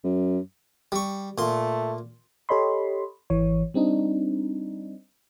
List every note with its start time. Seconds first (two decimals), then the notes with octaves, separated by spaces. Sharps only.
0.04 F#2
0.92 G3 C#6
1.38 A#2 A3 C6
2.49 G4 A4 C#5 D#5 B5 C6
3.30 G#1 E3 C#5
3.74 G3 C4 D4 D#4